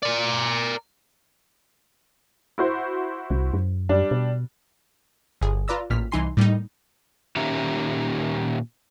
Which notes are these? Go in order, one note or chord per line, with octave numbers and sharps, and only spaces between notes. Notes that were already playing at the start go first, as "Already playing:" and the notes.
A#4 D5
E4 F#4 C5
C2
F#2
F#2 G3 D4
B2
G1 G#4
F4 B4 D5 A#5 E6
A1 A#2 F6 B6
C2 E3 D#4 G#5 C6 C7
A2 G3 A#3 D#4
A#2 D#3 C#4 G4 E5 A#5